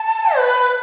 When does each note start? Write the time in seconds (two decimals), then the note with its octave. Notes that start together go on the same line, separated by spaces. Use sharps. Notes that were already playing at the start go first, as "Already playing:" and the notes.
Already playing: A5
0.36 B4